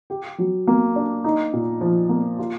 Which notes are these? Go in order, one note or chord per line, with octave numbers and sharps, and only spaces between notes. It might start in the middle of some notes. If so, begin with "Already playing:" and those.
G4
F#3
A#3
D4
D#4
A#2
F3
A#3
F4